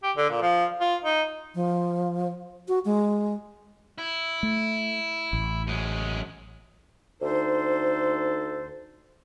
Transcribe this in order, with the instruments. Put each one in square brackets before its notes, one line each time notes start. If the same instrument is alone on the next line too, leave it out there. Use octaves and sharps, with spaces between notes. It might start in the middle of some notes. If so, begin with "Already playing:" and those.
[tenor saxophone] G4
D3
A#2
F3
F4
D#4
[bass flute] F3
F#4
G#3
[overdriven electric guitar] E4
[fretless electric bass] A3
A1
[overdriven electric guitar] F#2 G#3
[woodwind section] D2 D#4 A4 C5